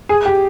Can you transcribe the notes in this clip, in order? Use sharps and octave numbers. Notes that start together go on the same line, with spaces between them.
G#4
G4